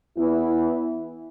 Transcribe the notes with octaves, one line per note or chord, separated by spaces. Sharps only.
E2 E3 B3 E4